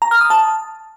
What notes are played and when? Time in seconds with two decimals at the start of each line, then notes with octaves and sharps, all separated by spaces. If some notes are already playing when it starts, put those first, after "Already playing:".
0.02 A#5
0.11 F6
0.21 D#6
0.30 A5